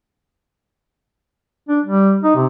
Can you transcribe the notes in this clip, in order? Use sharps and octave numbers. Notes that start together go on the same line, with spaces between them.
D4
G3
D#4
C3